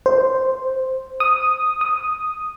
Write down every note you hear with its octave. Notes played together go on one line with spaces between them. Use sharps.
C5
D#6
D#6